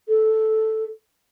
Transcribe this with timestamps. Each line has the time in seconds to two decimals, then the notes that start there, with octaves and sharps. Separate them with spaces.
0.09 A4